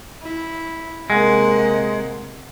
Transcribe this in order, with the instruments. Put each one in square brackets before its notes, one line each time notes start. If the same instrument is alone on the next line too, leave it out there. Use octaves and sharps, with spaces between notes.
[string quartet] E4
[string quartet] C3 A#3 F#5 [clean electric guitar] G#3